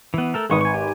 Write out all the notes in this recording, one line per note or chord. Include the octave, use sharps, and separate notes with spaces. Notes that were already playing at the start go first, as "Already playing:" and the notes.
E3 B3
A3 A4 A#4
G#1 G#3 B4 C#6 D#6
G#5 C#6
G4 G#5